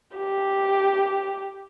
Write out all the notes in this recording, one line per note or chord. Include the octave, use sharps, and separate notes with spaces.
G4